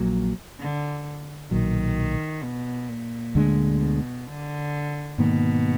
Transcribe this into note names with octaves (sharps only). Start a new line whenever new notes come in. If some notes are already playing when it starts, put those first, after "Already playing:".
Already playing: A#1 A#2 F#3
D3
B1 A#2 D#3 F#3
B2
A#2
D2 D3 G#3 D4
B2
D3
G#2 B2 D#3 A#3